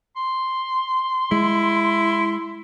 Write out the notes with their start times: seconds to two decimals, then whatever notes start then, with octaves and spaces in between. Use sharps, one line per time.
0.16 C6
1.31 G#3 E4